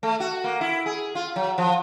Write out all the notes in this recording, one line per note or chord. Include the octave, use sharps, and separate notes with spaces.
A3
F#4
A#3
E4
G#4
F4
F#3
F3